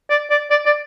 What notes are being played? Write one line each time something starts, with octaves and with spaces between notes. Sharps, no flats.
D5
D5
D5
D5